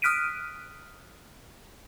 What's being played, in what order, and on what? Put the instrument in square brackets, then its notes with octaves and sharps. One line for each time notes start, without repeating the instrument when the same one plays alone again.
[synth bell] D#6 F6 F#6 B6 D7 D#7